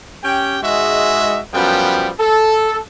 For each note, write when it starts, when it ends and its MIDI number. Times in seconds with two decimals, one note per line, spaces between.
0.24 0.59 61
0.24 0.59 67
0.24 0.59 79
0.63 1.41 44
0.63 1.41 56
0.63 1.41 66
0.63 1.41 75
0.63 1.41 76
1.53 2.10 42
1.53 2.10 53
1.53 2.10 55
1.53 2.10 59
1.53 2.10 79
2.20 2.78 69